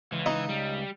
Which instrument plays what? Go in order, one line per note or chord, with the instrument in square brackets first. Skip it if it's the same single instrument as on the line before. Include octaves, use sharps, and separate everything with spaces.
[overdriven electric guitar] C#2 [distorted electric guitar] E3
[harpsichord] D#4
[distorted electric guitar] G3